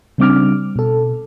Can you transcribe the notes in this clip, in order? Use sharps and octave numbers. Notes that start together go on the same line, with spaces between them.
C#3 G3 C4 D4 D6 F6
B2 A4